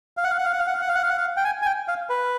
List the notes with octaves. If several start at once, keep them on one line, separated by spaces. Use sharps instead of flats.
F5
F#5
F5
F#5
F5
F#5
F5
F#5
F5
F#5
F5
F#5
F5
F#5
F5
G5
G#5
G#5
G5
F5
B4